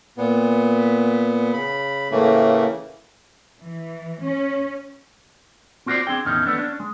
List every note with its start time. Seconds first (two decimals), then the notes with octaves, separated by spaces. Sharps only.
0.18 A#2 B3
1.53 C#3 B5
2.11 A2 C#3 E3 A3 A#3
3.61 E3
4.23 C#4
5.86 C4 F4 F#4 B4 C5 D5
6.07 C4 D4 G#4 G5
6.25 E2 A2 D#3 C#4 D#4
6.46 A3 B3 D4
6.58 C#4 D4
6.80 G#3